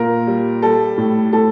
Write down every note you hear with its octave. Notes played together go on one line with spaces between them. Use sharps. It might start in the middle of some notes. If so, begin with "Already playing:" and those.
Already playing: A#2 A#4
G3
G3 A4
A2
A2 A4